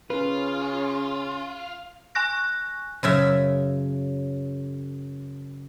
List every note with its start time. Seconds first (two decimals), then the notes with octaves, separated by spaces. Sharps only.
0.10 C#3 C#4 F4 B4
2.15 G#5 C#6 F#6 A#6
3.03 F#2 C#3 E5